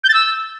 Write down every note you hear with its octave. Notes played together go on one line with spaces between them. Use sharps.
G6
A6
E6